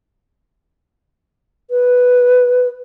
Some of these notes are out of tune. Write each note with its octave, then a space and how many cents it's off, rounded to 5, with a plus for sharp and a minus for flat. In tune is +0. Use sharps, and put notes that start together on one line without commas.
B4 +0